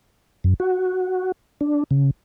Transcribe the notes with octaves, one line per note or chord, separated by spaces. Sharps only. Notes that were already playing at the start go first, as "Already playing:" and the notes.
F#2
F#4
D4
C#3